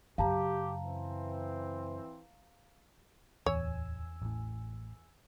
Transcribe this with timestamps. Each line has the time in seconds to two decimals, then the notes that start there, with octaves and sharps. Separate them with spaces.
0.18 F#2 C#3 G4 F5 A5 A#5
0.85 E3 C4
3.46 D1 E2 C#5 G#5 E6
4.22 A1 A2